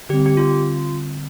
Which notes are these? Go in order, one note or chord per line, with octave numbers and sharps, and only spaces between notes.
D3 G3 C4 G4
G4
F4